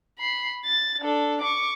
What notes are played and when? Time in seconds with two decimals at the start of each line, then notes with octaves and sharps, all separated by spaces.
0.19 B5 C7
0.66 A6
1.00 D4 A4
1.42 C#6 D6